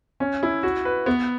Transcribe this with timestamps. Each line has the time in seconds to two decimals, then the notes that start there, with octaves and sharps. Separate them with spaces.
0.20 C#4
0.43 E4
0.63 F#4
0.85 B4
1.06 B3